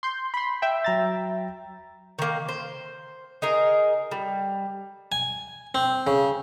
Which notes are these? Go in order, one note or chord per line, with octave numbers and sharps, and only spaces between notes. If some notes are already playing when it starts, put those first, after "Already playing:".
C6 G6
B5 C6
E5 G5
F#3 A#5 A6
D#3 A#3
C5
D#4 G#4 A#4
G3
G#5
C4
C#3